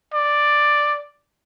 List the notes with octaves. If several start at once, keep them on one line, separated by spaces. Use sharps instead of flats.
D5